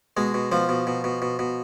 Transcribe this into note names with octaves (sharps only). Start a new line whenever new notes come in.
B2 G#3
B2
B2 F3
B2
B2
B2
B2
B2